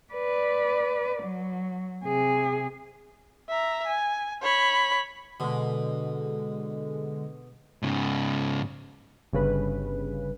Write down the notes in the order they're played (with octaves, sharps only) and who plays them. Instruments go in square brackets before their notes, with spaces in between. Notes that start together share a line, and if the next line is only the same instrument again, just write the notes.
[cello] B4 D5
F#3
C3 G#4
[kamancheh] E5 A#5
G#5
C#5 B5
[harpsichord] B2 [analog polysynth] D3 G#3
[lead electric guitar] G#2 C#3
[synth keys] G1 C#3 B4